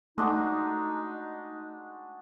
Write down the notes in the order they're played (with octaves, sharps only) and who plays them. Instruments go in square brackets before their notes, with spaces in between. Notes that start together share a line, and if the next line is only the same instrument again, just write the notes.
[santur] G#3 D4 F#4 [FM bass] A3 [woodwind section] D#4